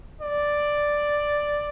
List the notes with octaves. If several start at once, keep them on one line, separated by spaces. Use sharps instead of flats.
D5